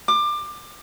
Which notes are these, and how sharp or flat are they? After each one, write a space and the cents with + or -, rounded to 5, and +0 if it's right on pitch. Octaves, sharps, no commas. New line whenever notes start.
D6 +25